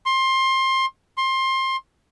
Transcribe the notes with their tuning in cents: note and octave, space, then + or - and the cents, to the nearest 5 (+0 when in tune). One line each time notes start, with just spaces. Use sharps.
C6 +20
C6 +20